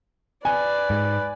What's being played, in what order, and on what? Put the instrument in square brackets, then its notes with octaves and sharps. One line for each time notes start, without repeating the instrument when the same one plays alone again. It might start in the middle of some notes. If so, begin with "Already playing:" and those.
[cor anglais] B4 [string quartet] D5 [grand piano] G#5
[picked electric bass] G#2